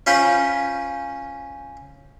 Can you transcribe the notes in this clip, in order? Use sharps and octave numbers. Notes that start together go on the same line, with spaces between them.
C#4 F4 C5 B5